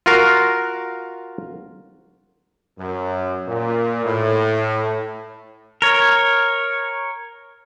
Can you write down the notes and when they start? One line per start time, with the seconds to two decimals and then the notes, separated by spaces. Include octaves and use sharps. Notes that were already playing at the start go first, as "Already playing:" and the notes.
0.06 F4 F#4 A#4 F5
2.79 F#2
3.48 A#2
4.05 A2
5.82 A#4 C#5